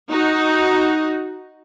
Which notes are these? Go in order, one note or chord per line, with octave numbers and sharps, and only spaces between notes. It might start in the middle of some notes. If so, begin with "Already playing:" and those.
D#4 F#4